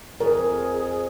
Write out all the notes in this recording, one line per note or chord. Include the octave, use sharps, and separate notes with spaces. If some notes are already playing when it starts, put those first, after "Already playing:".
F2 G#4 A#4